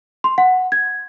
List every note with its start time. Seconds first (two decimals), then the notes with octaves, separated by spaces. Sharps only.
0.24 C6
0.38 F#5
0.72 G#6